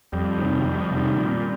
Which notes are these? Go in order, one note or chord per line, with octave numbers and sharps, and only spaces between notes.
F2 G3
C3 D#3
F2 G3
C3 D#3
A#2